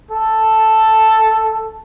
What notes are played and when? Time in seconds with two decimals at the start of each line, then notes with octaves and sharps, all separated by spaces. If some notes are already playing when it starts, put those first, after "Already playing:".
0.11 A4